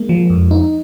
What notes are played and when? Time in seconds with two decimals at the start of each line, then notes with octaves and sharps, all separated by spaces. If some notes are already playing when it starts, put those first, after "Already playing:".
Already playing: G#3 A#3
0.09 F3
0.30 F2
0.51 D#4